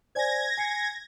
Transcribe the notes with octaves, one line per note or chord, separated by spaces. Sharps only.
C5 D5 G#5 G#6 A#6
G#5 C7 C#7